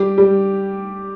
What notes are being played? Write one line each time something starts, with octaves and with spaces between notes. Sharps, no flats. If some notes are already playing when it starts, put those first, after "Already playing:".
Already playing: G3 G4
G3